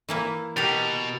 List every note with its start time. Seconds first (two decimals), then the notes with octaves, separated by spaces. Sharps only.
0.09 E3 A#3 E4
0.57 B2 G4 A#4 A6 F7